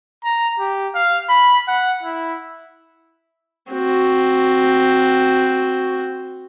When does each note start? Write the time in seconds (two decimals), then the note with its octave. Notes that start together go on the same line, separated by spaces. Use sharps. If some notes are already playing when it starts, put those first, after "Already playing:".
0.24 A#5
0.60 G4
0.95 F5
1.29 B5
1.68 F#5
2.03 E4
3.72 C4 F#4